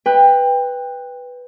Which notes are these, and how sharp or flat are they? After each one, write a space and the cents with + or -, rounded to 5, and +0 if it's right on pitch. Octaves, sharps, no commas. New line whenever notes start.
B4 +0 G5 +25